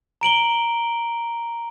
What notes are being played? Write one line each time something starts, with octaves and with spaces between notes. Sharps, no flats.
A#5 D7 F#7 G7